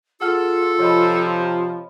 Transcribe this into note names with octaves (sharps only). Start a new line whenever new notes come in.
F4 G#4 A4 F#5 F6
C3 F3 C#5 D#5 B5